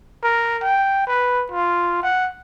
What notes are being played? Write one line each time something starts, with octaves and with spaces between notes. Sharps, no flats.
A#4
G5
B4
F4
F#5